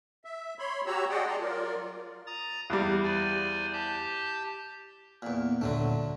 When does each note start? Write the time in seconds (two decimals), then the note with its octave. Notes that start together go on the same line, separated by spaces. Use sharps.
0.25 E5
0.59 C#5 B5 C6
0.86 F#4 G4 C#5 A#5 E6
1.10 G#4 D5 D#5 F#5 G5
1.27 D5 A5 A#5 C6
1.41 F#3 F4 A#4 D5
2.27 A#5 D#6 A6
2.70 E2 G3 F5
3.03 C5 D5 G#5
3.73 G4 A5 G6
5.22 E2 A#2
5.61 D#1 A#2 D3 F#3 A3 D4